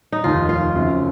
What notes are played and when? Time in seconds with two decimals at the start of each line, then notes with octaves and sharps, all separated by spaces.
0.12 D#4
0.24 F1 D#2 D#3 F4
0.49 F4
0.75 F#2 C#3 F#3 C4